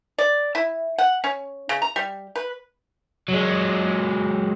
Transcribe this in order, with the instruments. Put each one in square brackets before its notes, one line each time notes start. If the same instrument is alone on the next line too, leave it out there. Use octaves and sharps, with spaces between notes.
[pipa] D5
E4
F#5
C#4
C#3
A#5
G3
B4
[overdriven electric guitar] F#3 G#3